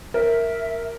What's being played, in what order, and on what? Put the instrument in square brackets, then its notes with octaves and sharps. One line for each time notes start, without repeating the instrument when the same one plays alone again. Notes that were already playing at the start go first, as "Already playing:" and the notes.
[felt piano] A#4 [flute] E5